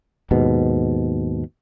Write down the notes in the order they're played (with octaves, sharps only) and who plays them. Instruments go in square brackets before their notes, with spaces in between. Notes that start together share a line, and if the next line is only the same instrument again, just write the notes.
[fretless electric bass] D#2 G#2 B2